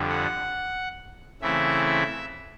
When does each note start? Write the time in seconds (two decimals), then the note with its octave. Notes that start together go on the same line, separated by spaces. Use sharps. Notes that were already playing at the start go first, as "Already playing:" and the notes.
Already playing: F2 D3 G3
0.09 F#5
1.41 C#3 E3 A3 C4 E4 E5
1.86 E5